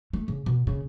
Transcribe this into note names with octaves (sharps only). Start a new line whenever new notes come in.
A3
C#3
B2
C#3